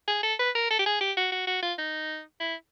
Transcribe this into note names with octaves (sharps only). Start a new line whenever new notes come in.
G#4
A4
B4
A#4
A4
G4
G#4
G4
F#4
F#4
F#4
F4
D#4
E4